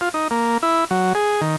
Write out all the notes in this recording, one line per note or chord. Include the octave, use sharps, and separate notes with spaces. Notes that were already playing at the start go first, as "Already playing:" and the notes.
F4
D#4
A#3
E4
F#3
G#4
D#3